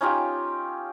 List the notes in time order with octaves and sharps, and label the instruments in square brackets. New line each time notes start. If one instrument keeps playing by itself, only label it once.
[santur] C#4 D#4 F4 G4